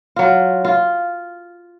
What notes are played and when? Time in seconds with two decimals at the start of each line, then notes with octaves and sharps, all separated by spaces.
0.16 F#3 F4
0.65 F4